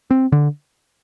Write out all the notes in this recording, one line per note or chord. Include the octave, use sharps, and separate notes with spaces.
C4
D3